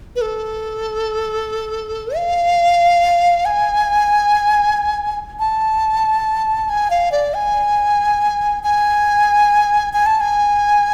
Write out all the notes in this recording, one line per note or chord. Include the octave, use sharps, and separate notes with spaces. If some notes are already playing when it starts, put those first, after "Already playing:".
B4
A4
F5
G#5
A5
G#5
F5
D5
G#5
G#5
G#5
A5
G#5